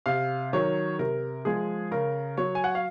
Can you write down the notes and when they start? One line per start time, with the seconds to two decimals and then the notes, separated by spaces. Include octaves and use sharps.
0.06 C3 F5
0.53 D#3 F#3 C#5
0.99 C3 A#4
1.45 F3 G#3 G#4
1.91 C#3 A#4
2.38 F#3 C#5
2.55 G#5
2.64 F#5
2.75 F5